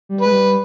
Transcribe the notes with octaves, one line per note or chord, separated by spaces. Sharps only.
G3
G#3 B4
G3